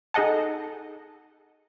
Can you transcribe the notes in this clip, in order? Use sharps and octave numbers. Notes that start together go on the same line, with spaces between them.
D#4 G#4 A4 D#5 F#5 A5